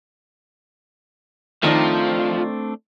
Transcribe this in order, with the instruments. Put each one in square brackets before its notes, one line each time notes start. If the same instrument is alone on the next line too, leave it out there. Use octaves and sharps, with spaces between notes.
[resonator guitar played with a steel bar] D#3 D#4 D5 [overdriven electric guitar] F3 [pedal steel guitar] A3 C4 D4